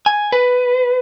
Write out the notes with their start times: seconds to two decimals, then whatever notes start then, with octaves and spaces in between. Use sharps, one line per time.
0.06 G#5
0.32 B4